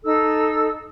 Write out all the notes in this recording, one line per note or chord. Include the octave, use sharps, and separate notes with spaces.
D#4 A4 E6